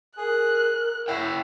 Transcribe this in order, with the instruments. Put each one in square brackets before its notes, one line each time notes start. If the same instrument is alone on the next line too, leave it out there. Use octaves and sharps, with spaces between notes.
[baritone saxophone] G#4 [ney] A#4 [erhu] F#6
[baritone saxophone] E4 [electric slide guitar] C#5 F#5 G5